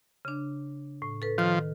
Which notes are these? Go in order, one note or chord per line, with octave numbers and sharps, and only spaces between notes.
C#3 D4
A2
A4 B4
D#3 F3 F6